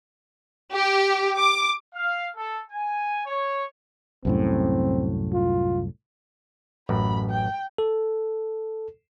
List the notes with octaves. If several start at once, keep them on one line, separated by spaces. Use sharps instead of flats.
G4
D6
F5
A4
G#5
C#5
C2 F#2 A2 C4
F4
A1 F#2 B5
G5
A4